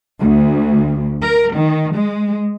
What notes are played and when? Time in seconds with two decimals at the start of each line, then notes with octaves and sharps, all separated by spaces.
0.20 D2
1.21 A#4
1.55 D#3
1.94 G#3